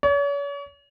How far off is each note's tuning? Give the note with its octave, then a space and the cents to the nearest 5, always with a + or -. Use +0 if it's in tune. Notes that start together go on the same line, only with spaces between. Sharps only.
C#5 +40